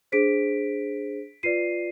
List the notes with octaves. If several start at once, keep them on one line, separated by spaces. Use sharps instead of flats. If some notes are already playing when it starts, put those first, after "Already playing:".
D4 G#4 C5 B6 D7
F4 B4 D5 C7 D#7